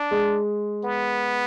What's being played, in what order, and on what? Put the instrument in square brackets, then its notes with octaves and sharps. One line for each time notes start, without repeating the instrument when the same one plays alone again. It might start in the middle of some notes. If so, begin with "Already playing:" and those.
Already playing: [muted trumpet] D4
[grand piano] G#3
[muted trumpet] B3